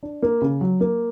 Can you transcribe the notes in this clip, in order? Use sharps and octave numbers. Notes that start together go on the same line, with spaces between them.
D4
A#3
C#3
F#3
A#3